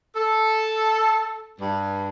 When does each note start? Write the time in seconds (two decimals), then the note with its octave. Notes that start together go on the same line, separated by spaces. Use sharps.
0.16 A4
1.60 G2